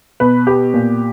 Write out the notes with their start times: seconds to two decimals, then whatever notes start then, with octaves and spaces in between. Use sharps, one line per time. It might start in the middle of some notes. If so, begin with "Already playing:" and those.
0.20 B2 B4
0.47 B3 G4
0.74 A#2